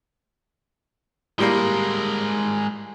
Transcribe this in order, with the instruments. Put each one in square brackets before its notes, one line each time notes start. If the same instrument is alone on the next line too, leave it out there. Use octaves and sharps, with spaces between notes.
[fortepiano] A2 G3 A#3 [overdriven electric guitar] G#3 A#4